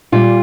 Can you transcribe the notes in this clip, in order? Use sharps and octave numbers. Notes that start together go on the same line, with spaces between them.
A#2 G3 F4